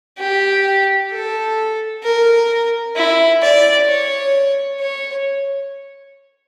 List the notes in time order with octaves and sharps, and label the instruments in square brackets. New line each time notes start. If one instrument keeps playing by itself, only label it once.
[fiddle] G4
A4
A#4
E4
D5
C#5
C#5